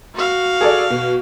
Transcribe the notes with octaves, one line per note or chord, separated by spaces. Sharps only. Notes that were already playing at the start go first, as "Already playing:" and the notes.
F#4 F5
G#4 A4 D5
B2